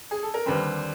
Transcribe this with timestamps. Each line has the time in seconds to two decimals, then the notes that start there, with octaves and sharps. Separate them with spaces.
0.11 G#4
0.23 A4
0.34 A#4
0.46 D#2 D3 G3 C4 B4